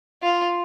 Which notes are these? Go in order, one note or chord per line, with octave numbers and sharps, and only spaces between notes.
F4